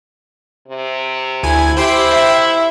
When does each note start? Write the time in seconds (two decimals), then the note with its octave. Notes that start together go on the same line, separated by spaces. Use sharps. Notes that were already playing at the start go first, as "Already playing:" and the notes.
0.68 C3
1.43 D2 E4 G#5
1.77 E4 G4 C5 G5 C6
2.10 E5